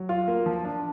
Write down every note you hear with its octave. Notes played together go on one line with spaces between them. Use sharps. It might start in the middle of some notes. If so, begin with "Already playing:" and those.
Already playing: F#3
F4
A#3
F3
D4